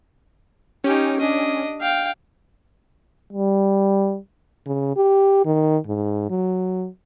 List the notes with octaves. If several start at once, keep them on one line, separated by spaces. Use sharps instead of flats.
C#4 D#4 G4
D4 D#5
F5 G5
G3
C#3
G4
D#3
G#2
F#3